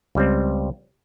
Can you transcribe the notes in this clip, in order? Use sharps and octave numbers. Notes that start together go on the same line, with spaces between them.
C#2 G3 C4